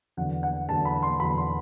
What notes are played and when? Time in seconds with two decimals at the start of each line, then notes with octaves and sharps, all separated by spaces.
0.17 E2 D3 F#3 F#5
0.43 F#5
0.69 E2 D3 F#3 A5
0.85 B5
1.03 C6
1.20 E2 D3 F#3 B5
1.38 C6